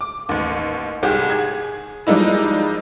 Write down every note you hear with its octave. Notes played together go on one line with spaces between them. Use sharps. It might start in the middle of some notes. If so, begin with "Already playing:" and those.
D6
A1 D#2
C2 G#2 G4 G#4
G#4 G#6
F3 G3 G#3 A#3 D#4 E4